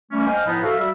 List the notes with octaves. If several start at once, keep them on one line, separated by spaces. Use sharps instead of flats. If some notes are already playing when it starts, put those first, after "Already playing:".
G3 A3 A#3 C#4
C5 D#5 F5 G5 G#5
A2 F3 B3 D#4 B5
F#4 A4 E5 F5
G3 F#4 E5